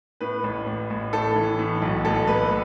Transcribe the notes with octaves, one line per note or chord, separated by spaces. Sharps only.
A2 B4
A1
A1
A1
A2 A4
E3
A2
B1
A1 A4
A1 B4